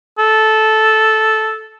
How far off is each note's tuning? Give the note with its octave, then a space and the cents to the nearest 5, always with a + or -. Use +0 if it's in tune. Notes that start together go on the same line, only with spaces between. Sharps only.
A4 -10